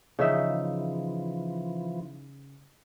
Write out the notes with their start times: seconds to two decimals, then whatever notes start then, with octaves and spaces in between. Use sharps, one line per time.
0.19 C#3 E3 F3 D#4 E5